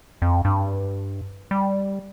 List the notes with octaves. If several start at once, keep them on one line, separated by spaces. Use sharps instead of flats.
F2
G2
G3